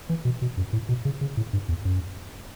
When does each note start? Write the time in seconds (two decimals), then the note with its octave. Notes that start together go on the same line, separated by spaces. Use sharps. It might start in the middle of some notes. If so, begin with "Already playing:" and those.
0.09 E3
0.25 B2
0.42 B2
0.57 F#2
0.73 A2
0.89 B2
1.05 C#3
1.21 C#3
1.37 A2
1.53 G2
1.69 E2
1.85 F#2